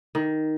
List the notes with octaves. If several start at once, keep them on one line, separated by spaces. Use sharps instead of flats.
D#3